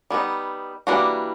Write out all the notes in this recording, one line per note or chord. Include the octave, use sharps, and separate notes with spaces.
G3 B3 D#4
E3 G3 A#3 D4 F#4